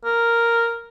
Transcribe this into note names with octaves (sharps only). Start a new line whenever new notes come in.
A#4